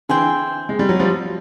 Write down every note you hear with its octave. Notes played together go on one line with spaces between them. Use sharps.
D3 E3 G#4 C5 E5 G5
G#3
G3
F#3
F3 G3